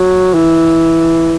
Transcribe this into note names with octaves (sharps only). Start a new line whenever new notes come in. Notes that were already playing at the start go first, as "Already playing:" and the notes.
Already playing: F#3
E3